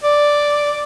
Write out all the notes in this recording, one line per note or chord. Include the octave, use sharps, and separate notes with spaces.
D5